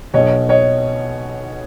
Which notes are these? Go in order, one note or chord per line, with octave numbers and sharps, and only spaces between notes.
B1 B2 C#5 D#5
C#5 D#5